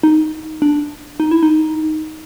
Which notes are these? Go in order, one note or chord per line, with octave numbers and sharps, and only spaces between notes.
D#4
D4
D#4
E4
D#4